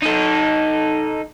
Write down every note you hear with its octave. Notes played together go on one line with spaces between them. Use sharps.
D#4 A4